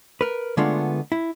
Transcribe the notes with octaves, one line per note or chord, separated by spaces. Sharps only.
A#4 B4
D3 G#3 A3 B3 D4 F4
E4